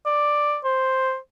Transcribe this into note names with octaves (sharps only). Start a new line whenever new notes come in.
D5
C5